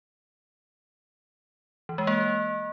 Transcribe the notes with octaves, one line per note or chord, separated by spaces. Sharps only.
E3
G#3
A#3